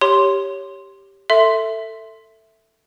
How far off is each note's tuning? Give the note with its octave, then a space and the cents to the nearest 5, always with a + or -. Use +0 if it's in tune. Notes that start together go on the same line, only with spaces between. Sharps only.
G4 +0 C#5 +0 C6 +0
A4 +20 E5 +0 C6 +0